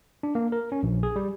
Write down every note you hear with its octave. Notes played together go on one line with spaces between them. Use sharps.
D4
A#3
A#4
C#4
A#1
G#4
G3